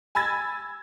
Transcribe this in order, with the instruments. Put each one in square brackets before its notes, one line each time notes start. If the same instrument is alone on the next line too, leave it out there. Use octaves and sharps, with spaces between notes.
[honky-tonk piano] G#5 B5 E6 G#6 A6